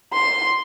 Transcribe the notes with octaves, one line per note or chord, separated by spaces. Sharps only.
C6